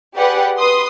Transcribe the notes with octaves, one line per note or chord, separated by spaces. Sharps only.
G4 G#4 B4 D5 F#5
B4 C6 D#6